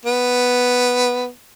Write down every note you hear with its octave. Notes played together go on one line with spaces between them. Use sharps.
B3